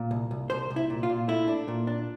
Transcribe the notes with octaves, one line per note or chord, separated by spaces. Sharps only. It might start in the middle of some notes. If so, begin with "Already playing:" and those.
Already playing: A#2
C2
C2
C2 C5
C2
E4
A#2
F4
A#2
A3 E4
D4
A#2
D4